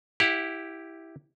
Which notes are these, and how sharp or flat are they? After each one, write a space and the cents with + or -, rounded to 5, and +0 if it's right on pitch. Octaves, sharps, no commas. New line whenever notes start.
E4 -5 G4 +0 F#5 -35